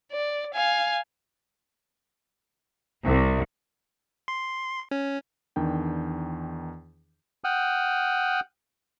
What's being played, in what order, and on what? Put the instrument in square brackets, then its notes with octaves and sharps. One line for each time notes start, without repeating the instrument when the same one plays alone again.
[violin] D5
F5 G#5
[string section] C2
[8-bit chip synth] C6
C#4
[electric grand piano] E2 D#3 D4 G5
[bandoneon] F#5 G5 D#6 F6